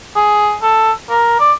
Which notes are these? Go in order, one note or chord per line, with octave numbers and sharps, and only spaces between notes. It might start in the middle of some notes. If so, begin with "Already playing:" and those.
G#4
A4
A#4
D5